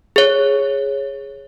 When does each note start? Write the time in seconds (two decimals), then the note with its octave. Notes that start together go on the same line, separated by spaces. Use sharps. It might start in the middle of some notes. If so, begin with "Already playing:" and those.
0.16 G#4 C#5